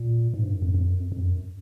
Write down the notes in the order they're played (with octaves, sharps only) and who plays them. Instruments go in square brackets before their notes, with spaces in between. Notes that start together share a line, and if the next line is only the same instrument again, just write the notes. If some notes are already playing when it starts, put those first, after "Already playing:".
Already playing: [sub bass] A#2
G#2
G2
F#2
F2
F2
F#2
F2
F2
F#2